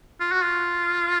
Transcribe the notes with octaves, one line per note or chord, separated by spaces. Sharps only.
F4
F#4
F4